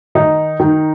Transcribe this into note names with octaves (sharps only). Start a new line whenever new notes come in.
D#3 D#4
D#3